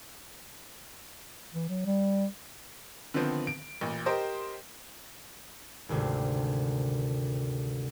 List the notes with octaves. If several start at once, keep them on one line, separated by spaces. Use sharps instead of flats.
E3
F#3
G3
D3 D#3 F3 B3 C4
D7
A1 A#2
G4 A#4 C5 D#5
G#1 D2 C3